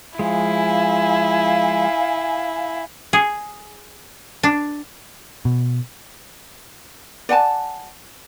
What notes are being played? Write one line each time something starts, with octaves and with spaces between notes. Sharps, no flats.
F3 G#3 E4 F5 G#5
G#4
D4
B2
D5 F#5 G#5 A5